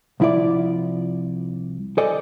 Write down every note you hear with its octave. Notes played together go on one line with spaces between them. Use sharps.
C2 F3 E4 F4 D5
A4 C5 D5 D#5 G#5